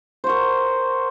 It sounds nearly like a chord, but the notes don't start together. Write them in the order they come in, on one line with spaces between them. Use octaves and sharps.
C5 F#4 A#4